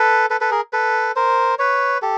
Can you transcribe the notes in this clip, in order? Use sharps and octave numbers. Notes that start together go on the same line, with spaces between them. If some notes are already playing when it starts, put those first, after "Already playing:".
Already playing: A4 B4
A4 B4
A4 B4
G#4 A#4
A4 B4
A#4 C5
B4 C#5
G4 A4